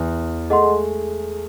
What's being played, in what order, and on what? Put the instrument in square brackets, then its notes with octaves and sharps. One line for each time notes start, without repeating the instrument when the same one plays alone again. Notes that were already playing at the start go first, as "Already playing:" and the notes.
Already playing: [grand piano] E2 E3
[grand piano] A3 [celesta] G#4 D#5 F#5 C6
[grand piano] G#3